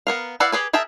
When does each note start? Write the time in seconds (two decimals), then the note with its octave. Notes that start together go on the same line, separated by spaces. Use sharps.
0.07 B3 A#4 F5
0.40 E4 B4 D5 F5 F#5
0.52 G4 G#4 B4 G#5
0.73 G#4 A#4 E5 G5 A5